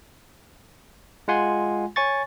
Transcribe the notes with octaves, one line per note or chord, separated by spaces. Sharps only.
G#3 F4 F#5 G#5 C6
C#5 G#5 C#6 A6